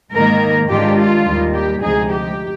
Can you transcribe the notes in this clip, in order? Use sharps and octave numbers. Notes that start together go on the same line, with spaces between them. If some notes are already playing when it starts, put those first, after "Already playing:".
G#2 D#3 A#3 A#4
G#2 D#3 G#3 D4 F4 G4
F4
D#2 D#3 G3
G4
D2 C3 F3 G#3 D#4 G#4
G4